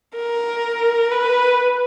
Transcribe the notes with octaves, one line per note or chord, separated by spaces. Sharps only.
A#4
B4